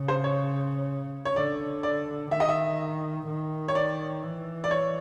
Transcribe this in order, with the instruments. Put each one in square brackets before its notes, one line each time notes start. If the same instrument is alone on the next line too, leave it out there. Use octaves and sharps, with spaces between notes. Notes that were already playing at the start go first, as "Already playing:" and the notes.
Already playing: [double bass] C#3
[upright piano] C5
C#5
C#5
[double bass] D3 [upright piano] D5
[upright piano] D5
[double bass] D#3 [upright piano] E5
[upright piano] D#5
E5
[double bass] D#3
[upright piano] C#5
D5
[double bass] E3
[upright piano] D5
C#5